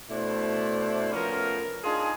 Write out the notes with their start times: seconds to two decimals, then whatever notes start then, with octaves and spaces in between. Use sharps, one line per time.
0.10 B2 A3 D4 E4 C5
1.13 F3 A3 B3 C#4 A#4
1.84 D4 D#4 F4 G#4